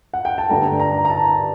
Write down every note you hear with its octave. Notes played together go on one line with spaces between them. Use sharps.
F#5
G5
A5
G2 D3 A3 A#5
A#5
A#5
A5